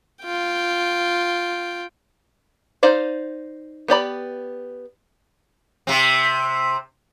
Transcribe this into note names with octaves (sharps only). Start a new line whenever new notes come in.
F4 G5
D#4 C5 D5 F5
B3 G4 D5 B5
C3 C4